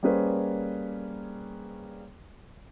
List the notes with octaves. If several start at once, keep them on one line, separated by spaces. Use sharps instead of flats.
G3 A#3 C#4 G#4 B4 C5